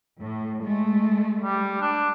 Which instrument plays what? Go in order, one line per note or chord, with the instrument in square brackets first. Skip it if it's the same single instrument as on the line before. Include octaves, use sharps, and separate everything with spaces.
[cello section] A2
G#3 A3
[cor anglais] G3
D4